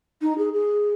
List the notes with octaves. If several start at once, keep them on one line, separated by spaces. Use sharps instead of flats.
D#4
G#4
G#4